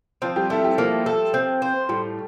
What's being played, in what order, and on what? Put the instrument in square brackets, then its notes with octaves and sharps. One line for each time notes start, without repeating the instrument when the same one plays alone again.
[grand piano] F3 F4 [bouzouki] C4
[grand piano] G3 G4
[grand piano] A3 A4 [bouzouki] E4
[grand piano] G3 G4
[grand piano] F3 F4 [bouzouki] A#3
[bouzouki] A4
C4
C5
[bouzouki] A2 [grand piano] G3 G4